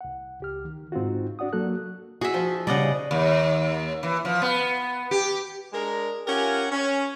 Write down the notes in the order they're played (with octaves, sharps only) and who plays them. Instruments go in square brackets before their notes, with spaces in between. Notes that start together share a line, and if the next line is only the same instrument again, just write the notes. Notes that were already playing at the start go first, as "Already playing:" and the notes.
[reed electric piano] C2 F#5
C#2 G4 F6
D#3
G#2 C4 D#4 F4 F#4
D4 F#4 D5 F#5 D#6
F#3 A#3 F#4 A4 F#6
[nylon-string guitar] F#4 [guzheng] G#4 E5
[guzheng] F3
[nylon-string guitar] C#3 G3 [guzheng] D5 D#5 F#5
[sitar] D#2
E3
F3
B3
G4
[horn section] G#3 D4 G#4 A#4
C#4 F4 G4 A#4 F#5 G#5
C#4